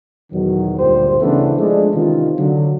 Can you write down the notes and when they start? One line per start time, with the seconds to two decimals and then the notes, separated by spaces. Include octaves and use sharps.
0.33 E2 B2 D#3 F#3
0.79 D2 G2 A#2 G4 C5
1.21 C#3 E3 A3 B3 C#4 D4
1.57 F3 G#3 A3 D4
1.94 C3 D#3 E3 C#4 F4
2.38 D3 F#3